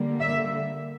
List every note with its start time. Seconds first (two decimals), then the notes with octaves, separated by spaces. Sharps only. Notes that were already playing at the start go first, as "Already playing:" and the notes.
Already playing: D3 G3 A#3
0.20 E5